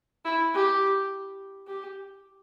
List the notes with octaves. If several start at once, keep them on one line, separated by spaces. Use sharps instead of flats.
E4
G4
G4